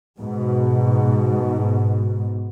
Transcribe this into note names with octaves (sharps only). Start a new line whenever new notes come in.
G#2 B2